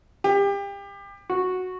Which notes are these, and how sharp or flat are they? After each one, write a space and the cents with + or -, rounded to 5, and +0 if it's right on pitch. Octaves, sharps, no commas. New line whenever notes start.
G4 +30
F#4 -5